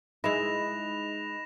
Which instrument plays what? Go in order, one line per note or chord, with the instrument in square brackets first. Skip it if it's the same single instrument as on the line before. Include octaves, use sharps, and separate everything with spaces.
[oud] G#3 E4 [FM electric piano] D#4 D#5 [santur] B4 [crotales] A#6 E7 F7